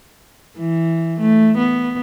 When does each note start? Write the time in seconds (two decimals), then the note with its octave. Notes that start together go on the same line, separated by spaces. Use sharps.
0.58 E3
1.20 A3
1.58 B3